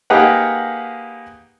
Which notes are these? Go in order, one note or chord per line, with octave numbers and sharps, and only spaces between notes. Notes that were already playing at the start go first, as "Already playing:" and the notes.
A#3 D#4 G4 G#4 B4 F#5